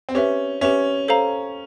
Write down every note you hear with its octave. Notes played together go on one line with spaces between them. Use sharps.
C4
C#4 G4 B4 E5
C#4 G4 B4 E5
A4 C5 F5 A#5